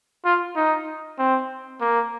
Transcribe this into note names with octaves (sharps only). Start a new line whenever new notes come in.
F4
D#4
C4
A#3